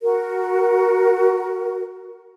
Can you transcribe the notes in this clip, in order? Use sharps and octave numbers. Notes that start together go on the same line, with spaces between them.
F#4 A#4